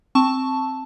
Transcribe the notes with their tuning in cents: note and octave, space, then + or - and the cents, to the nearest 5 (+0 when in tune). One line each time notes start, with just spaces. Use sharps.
C4 +5 A5 +0 C#6 +0